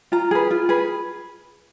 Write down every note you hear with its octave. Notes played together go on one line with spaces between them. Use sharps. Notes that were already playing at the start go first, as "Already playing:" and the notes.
F4 A#5
G#4 B4
F4
G#4 B4